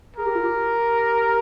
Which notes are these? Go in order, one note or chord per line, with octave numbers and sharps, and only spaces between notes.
G#4 A#4
G4
F4
G4